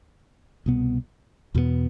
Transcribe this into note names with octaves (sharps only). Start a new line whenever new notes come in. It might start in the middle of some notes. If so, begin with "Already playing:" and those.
C2 B2 B3
E2 B2 G3 B3